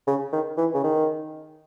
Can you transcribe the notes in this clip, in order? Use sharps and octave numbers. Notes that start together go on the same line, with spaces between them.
C#3
D#3
E3
C#3
D#3